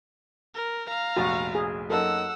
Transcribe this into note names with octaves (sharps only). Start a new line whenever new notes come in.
A#4
F5 A#5
F1 A#1 F#4 A6
G#4
F#2 A#3 D#4 A4 F#5 E6